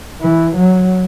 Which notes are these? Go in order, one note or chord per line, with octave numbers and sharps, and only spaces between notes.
E3
F#3